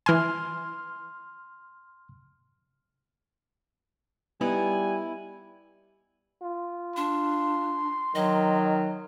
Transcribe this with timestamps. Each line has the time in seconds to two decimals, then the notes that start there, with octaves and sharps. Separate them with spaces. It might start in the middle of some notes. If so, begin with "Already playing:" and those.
0.06 E3 G#5 C6 F6
4.41 G3 B3 D#4 E4 G#5
6.42 F4
6.96 D4 C6
8.15 D#3 F#3 D#5